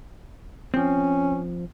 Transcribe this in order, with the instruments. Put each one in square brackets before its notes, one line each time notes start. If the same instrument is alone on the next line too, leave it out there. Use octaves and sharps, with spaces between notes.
[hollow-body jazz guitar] F3 C4 [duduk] C#4